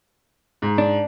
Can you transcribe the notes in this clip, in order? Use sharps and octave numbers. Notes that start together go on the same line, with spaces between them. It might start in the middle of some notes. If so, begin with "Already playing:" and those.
G#2
D4